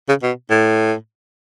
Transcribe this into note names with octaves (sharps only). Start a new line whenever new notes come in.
C#3
B2
A2